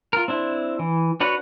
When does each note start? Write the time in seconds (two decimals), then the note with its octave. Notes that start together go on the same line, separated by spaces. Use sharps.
0.13 F4 A#4
0.28 C4 D4 E4
0.79 E3
1.20 D4 F#4 B4 C#5 F#5